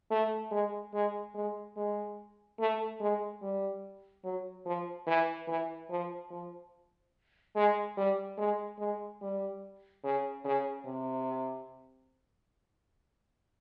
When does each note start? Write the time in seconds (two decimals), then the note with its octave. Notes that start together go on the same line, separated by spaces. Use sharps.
0.11 A3
0.51 G#3
0.93 G#3
1.34 G#3
1.76 G#3
2.59 A3
3.00 G#3
3.42 G3
4.24 F#3
4.66 F3
5.07 E3
5.48 E3
5.90 F3
6.31 F3
7.55 G#3
7.97 G3
8.38 G#3
8.79 G#3
9.21 G3
10.04 C#3
10.44 C#3
10.86 C3